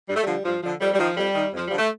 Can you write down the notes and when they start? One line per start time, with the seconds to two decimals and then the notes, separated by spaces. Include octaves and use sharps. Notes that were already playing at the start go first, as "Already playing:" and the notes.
0.09 G2 G3
0.16 A3
0.23 D3 F3 G3
0.45 G2 F3
0.63 D3 F3
0.81 F2 G3
0.94 G3
0.99 D#3 F3
1.17 F2 G3
1.35 D#3
1.53 F2 F3
1.68 D3 F3 G3
1.78 A3